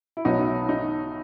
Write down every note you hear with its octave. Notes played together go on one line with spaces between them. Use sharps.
E4
B1 A2 F#3 B3 D#4
E4
D#4